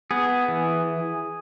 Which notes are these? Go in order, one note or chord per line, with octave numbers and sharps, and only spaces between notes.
B3 G#4
E3